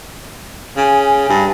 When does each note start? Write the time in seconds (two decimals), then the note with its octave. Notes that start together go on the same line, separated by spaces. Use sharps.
0.77 C#3 G#5
1.29 G2